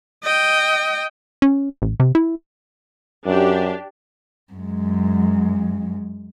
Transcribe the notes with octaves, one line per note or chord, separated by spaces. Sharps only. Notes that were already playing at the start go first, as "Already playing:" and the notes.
D#5 G5
C#4
A1
C3
E4
F#2 D4 G4
F#2 G#3